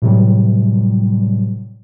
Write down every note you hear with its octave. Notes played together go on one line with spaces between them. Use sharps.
A2 C3 E3 F#3 G3